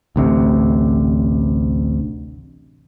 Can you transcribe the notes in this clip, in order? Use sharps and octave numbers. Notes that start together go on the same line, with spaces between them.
A1 D2 C3